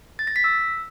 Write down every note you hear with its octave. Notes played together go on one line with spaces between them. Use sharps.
A6
A#6
B6
E6